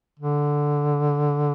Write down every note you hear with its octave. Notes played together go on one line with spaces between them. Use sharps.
D3